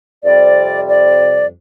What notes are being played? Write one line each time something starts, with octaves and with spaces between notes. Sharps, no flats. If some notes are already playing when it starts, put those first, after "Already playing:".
F2 C3 G3 D5
D5